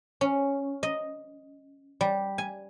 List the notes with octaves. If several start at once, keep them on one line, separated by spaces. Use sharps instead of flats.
C#4
D#5
G3
G#5